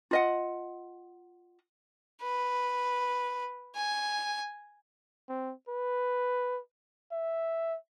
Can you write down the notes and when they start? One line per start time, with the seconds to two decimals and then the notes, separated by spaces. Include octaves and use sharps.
0.11 F4 D#5 F#5
2.23 B4
3.76 G#5
5.29 C4
5.69 B4
7.12 E5